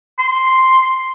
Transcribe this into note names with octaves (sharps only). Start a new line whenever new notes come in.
C6